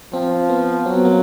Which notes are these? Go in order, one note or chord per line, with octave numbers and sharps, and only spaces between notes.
F3 C4
B3
F#3 C4
B3
A#3